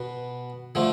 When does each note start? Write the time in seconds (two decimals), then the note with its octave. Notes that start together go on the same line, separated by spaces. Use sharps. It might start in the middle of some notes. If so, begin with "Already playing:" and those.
Already playing: B2 B3
0.75 D3 F3 A3